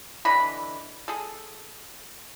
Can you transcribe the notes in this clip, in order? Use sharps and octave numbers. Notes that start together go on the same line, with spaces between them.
D3 E3 D#5 B5
G#4 A4